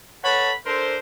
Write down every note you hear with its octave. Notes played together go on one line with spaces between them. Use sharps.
A4 B4 C#5 F#5 A5 B5
D4 A4 A#4 C5